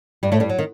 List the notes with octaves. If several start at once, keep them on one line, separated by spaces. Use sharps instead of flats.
G2 G3
A2 A3
G2 G3
F#3
D#3